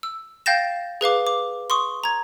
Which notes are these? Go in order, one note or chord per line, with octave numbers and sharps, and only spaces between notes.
E6
F5 G5 G6 A6 A#6 E7
G#4 B4 F5 D6
D6
C6 C#6 D#6
A#5 G#6